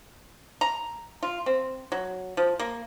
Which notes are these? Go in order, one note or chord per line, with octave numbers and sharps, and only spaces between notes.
A#5
F4
C4
F#3
F3
A#3